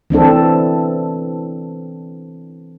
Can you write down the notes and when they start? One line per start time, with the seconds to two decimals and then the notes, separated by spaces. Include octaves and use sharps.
0.10 E3 C4 D4 A4